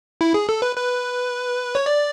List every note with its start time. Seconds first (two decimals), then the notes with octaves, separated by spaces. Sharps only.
0.21 E4
0.34 G#4
0.49 A4
0.62 B4
0.76 B4
1.75 C#5
1.86 D5